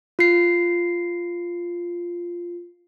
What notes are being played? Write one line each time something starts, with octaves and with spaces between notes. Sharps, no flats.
F4 C7